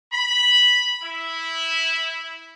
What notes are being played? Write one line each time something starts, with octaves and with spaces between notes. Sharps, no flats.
B5
E4